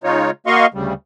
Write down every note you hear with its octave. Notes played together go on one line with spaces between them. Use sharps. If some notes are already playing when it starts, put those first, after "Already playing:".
C#3 G#3 D#4 F4 C#5
A#3 F#4 D#5 F5 C6 C#6
D2 C#3 G3